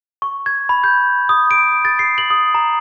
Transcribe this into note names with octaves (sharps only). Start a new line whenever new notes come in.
C#6
G#6
B5
G6
D#6
D7
A6
C7
F#7
D#6
A#5